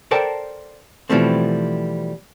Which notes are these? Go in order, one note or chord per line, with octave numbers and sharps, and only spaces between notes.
A4 A#4 C5 D5 G5 A5
B2 E3 F3 G3 A3 C4